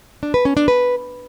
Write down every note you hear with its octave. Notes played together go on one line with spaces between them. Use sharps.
D4
B4
C#4
D4
B4